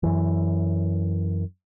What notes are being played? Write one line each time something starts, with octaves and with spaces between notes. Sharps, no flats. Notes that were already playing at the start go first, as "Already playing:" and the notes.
F#2 E3